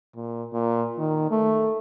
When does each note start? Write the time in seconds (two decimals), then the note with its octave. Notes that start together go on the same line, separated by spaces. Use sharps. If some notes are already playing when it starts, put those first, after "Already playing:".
0.15 A#2
0.53 A#2
0.98 D#3
1.31 A3